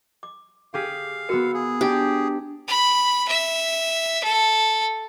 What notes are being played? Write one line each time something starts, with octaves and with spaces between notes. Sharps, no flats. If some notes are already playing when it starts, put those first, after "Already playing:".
D6
G4 G#4 F5 B6
B3 F#4 A#4 E6 C#7
G#4
D4 G4
B5
E5
A4